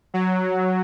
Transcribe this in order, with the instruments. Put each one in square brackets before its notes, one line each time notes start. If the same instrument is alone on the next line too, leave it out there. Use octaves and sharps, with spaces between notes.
[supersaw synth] F#3